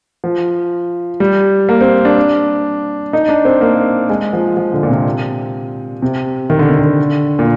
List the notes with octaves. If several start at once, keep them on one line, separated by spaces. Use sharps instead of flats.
F3
G3
A#3
C4
D4
D#4
D4
C4
A#3
G#3
F3
F3
D3
A#2
C3
C3
D#3
D3
C3
D3
A#2